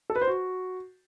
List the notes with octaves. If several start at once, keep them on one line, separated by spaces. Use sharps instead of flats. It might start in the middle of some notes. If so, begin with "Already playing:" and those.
A4
B4
C5
F#4